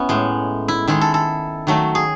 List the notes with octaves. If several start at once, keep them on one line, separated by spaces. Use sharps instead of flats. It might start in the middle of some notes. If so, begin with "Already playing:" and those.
Already playing: B3 C#4 E4
A2 G#3
E4
D#3 G#3 E4
A4
A4
D#3 F#3 A3
G#4